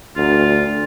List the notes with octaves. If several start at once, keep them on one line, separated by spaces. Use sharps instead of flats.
D2 F4